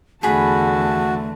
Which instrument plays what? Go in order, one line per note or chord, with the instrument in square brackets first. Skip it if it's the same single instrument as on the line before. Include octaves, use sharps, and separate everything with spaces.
[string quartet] E2 D3 A5 [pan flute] A3 [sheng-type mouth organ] F#4 [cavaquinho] G#4 B5